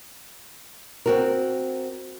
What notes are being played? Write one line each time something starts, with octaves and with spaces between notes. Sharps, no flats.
C4 F#4 A#4